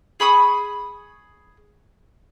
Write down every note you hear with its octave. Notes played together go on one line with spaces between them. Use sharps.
G#4 B5 C#6 D#6